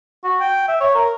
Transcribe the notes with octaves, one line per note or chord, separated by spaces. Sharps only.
F#4
G5
E5
C#5
A#4